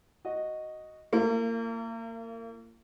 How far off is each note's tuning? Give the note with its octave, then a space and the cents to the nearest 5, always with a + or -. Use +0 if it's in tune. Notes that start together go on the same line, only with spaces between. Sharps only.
F#4 +0 D#5 +0
A#3 -30 F4 -45